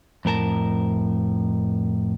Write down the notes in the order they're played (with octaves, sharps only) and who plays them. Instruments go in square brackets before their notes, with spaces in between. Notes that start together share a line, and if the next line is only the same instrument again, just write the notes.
[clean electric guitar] F2 A2 A#4 A5 A#5